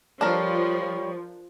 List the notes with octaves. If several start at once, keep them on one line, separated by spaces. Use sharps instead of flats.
F3 G3 D4 A4 A#4 C#5